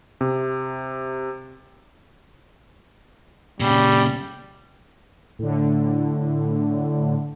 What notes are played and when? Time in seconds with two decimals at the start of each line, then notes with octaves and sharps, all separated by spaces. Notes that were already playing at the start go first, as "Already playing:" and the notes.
0.21 C3
3.60 A#2 C#3 G3
5.39 A2 D3